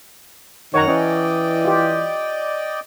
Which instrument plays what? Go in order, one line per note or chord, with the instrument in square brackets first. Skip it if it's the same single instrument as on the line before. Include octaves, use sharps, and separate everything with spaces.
[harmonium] F#2 [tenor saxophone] D#3 [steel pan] C#5 F#5 A#5
[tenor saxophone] E3 [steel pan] C#4 [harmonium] D5 D#5 G5
[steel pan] F4 G4